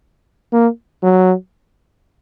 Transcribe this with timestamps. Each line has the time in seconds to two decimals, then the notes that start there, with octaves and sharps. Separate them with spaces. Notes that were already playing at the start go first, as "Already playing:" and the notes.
0.52 A#3
1.03 F#3